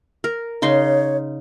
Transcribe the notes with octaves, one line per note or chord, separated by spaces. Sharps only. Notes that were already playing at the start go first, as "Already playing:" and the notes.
A#4
C#3 D#4 C#5 C6